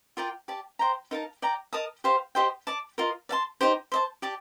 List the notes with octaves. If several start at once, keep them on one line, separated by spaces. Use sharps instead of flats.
F4 A#4 D5 G5
G4 D5 A5
C5 G5 A#5
D#4 A#4 F5 A5
D5 G5 A#5
A#4 D#5 A5 D#6
G4 C5 F5
G4 C5 D#5 G5
D5 A5 D6
F4 A#4 D#5
D5 F5 A5 C6
D#4 G4 C5
C5 D#5 A5
G4 D5 A5